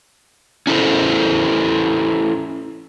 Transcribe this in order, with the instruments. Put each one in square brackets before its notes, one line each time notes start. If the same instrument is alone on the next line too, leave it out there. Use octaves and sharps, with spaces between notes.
[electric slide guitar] C#4 E4 A4 C5